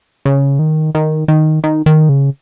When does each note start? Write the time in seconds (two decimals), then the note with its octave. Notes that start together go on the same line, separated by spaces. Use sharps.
0.25 C#3
0.59 D#3
0.95 D#3
1.28 D#3
1.64 D#3
1.86 D#3
2.09 C#3